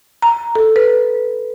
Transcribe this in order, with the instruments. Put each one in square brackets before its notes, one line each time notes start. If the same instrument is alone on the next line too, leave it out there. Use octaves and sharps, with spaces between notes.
[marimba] A#5
A4
B4